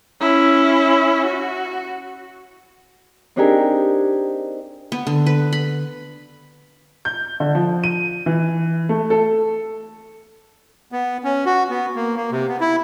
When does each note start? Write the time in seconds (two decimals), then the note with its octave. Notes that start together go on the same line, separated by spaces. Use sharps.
0.21 C#4 E4
1.26 F#4
3.36 C4 D4 D#4 G4 G#4 A#4
4.92 B3
5.07 D3
5.26 B4
5.53 B5
7.05 G6
7.40 D3
7.55 F3
7.84 D#7
8.26 E3
8.89 A3
9.10 A4
10.92 B3
11.24 C#4
11.46 F#4
11.70 B3
11.96 A#3
12.16 A#3
12.32 C3
12.48 B3
12.61 E4